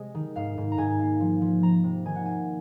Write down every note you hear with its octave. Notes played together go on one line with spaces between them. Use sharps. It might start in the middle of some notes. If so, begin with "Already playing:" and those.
Already playing: C3 G#3 D#5
D#3
G#2 F5
G#2
A#5
G#2 G#5
A#3
F3
F3
F3 A#5
C3
D#3 G#5
F#5
A#3 G#5